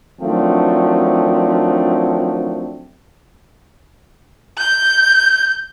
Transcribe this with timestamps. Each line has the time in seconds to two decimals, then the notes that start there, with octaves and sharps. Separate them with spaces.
0.21 D#3 F3 F#3 A3 C4 D4
4.58 G6